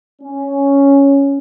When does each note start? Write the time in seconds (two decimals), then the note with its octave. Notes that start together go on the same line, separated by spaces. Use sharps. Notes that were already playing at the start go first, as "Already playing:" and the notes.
0.22 C#4